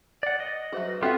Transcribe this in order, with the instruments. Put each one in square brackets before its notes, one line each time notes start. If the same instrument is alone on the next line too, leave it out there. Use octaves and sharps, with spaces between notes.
[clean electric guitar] D5 F#5
D#5
[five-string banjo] F#3 F#4 [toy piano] G#4 C5 E5
[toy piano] B4
[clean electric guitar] B3 F4 [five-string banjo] C4 F#4 E5 [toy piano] A4 F#5